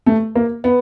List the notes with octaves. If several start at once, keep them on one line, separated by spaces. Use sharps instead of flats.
A3
A#3
B3